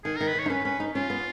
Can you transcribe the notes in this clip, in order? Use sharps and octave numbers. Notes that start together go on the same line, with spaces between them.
D#3 G#4
D#3 A#4
B4
D#3 C#5
D#4
C#4 B4
C#4 B4
D#4
C#4 F4
B3